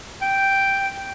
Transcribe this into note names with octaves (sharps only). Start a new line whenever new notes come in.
G5